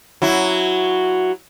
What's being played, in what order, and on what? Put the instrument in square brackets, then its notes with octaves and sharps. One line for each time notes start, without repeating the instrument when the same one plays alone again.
[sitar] F#3 E4